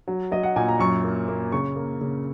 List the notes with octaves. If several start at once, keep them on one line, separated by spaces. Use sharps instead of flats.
F#3
F#3 D#5
F#5
A#2 G#5
A#5
F#2 C#6
A#3
A#3
C#3 C#6
A#3
C#3